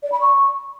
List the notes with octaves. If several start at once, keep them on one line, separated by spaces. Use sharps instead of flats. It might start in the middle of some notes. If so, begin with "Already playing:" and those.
D5
B5
C#6